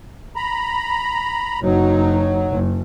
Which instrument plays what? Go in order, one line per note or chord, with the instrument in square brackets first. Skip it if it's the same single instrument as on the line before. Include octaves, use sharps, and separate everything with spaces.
[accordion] A#5 B5
[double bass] F#1 D#4 [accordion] F#3
[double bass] F#1